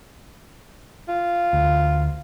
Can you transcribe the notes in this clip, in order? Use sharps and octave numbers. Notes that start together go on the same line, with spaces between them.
F4
D2